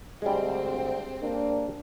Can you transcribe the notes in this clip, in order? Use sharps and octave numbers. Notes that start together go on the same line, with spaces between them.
D2 G3 G#3 C4
A#3 D4